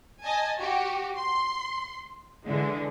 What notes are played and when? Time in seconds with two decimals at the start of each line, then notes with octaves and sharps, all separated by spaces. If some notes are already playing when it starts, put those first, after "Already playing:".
0.23 D#5 G#5 A5
0.59 F#4 G4
1.16 C6
2.47 D3 E3 G#3